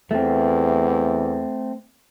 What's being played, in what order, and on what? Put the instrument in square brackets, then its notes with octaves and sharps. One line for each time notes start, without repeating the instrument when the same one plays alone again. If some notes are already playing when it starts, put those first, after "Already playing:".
[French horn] E2 [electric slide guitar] A3 C4